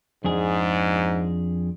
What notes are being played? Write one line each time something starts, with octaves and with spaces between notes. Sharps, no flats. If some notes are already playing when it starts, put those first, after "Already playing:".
F2 G#2 D4 G#4